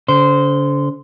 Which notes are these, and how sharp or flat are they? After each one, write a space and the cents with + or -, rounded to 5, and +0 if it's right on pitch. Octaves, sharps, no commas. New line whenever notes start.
D3 -45 C5 -15